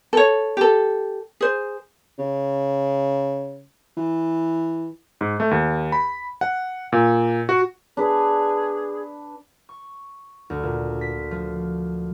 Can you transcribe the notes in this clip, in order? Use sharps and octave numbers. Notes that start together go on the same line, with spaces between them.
A4 C#5
G4 A4
G#4 C5
C#3
E3
G#2
A3
D#2
B5
F#5
A#2
F#4
D4 G#4 B4
C#6
D2
A#2
B6
F3